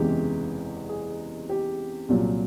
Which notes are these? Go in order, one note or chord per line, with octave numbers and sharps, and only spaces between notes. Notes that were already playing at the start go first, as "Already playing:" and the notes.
Already playing: F#1 E2 C3 E3 G#3 G4
G#4
G4
C2 A#2 F#3